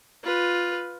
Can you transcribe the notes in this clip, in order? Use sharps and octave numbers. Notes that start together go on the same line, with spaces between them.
F4 B4